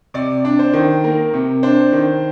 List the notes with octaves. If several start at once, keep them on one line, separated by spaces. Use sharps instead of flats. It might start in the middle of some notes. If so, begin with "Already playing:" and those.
C3 D5
D4
C5
D#3
A#3 A#4
C3
D4 C5
D#3